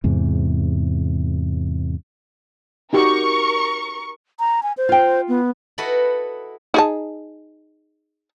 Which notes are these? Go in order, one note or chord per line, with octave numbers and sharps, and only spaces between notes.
E2 G#2 C3
D#4 F#4 G4 A#4 C#6
A#5
G#5
C5
F4 G5
B3
E4 F#4 A4 B4 D#5 F#5
D#4 G#4 A5